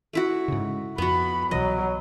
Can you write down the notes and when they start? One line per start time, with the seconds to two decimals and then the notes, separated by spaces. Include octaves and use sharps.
0.13 A3 E4 F#4
0.48 G#2 C#3
0.98 F2 B3 F#4 B5
1.51 C2 B2 E3 F#3 D#5